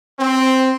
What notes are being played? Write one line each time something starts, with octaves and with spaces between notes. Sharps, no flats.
C4